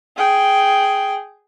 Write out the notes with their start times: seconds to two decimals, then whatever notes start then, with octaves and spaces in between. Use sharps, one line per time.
0.17 G#4 G5